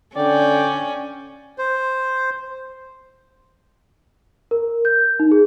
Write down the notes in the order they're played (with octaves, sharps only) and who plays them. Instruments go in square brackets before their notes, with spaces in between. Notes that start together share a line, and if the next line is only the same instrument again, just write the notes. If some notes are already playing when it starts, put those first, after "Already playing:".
[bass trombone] D3 [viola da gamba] C#4 [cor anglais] D5 [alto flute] G5
[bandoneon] C5
[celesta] A#4
G6
D#4
G#4